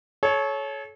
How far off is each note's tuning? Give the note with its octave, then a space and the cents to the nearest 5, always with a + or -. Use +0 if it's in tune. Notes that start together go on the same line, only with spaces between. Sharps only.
A4 -35 C#5 +0